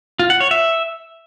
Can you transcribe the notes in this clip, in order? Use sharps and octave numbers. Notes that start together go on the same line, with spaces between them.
F4
F#5
C#5
E5